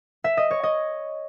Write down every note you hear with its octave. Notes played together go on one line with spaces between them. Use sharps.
E5
D#5
C#5
D#5